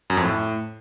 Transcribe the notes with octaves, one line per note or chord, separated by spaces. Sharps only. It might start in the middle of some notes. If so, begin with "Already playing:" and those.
F#2
F2
A2